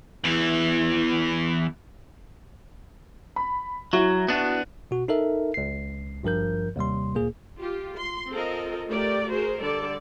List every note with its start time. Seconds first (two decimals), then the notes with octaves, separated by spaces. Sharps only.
0.24 E2 E3
3.36 B5
3.93 F#3 E4 F#4
4.28 B3 D4
4.91 B2 F#4
5.08 D#4 A4 A#4 E5
5.54 C#2 C7
6.23 G#1 G2 F3 A#4 G6
6.76 D#2 C3 G3 C6
7.15 D2 A#2 A#3 G#4
7.59 F4 G4
7.96 C6
8.31 C4 F4 A4 A#4 D#5
8.89 A3 G4 A#4 D5
9.30 F#4 G#4 A#4 C5
9.60 D3 G3 A4 D5